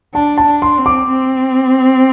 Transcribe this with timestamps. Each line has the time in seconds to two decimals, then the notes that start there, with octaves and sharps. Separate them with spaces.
0.14 D4 A5
0.37 A5
0.46 D4
0.62 C6
0.78 C4
0.86 D6
1.10 C4